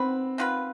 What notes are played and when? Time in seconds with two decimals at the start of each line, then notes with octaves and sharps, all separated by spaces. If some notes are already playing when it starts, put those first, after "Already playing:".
Already playing: D#3 B3 C4 B4
0.38 D#3 B3 F4 B4